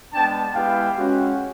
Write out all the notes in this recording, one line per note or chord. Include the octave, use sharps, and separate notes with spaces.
G#3 B3 D4 G5 A5
G#3 B3 E4 G4 F5 G5
G#3 C#4 F#4